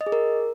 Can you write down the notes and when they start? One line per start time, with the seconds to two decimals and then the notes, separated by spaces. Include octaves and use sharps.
0.01 D#5
0.06 G#4
0.12 A#4